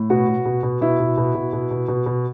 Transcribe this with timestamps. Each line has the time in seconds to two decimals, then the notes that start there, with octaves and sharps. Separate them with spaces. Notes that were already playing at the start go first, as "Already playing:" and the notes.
Already playing: A2
0.10 B2 F#4
0.28 B2
0.45 B2
0.63 B2
0.81 B2 E4
1.00 B2
1.17 B2
1.35 B2
1.53 B2
1.71 B2
1.88 B2
2.06 B2